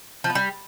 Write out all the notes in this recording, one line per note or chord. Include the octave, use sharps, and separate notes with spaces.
F3
B3
G3